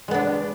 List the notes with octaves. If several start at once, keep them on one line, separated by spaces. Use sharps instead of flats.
G#3 B3 D4